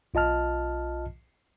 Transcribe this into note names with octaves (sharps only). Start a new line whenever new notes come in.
B1 F4 D#5 A5 F6